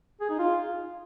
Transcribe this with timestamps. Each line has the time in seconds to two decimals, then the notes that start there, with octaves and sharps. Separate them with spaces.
0.21 G#4
0.30 D#4
0.39 F4